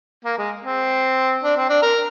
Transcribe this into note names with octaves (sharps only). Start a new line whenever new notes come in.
A#3
G#3
C4
D4
C4
D4
A#4